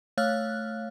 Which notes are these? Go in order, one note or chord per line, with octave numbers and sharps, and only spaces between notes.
A3 C#5 F5 F6 F#6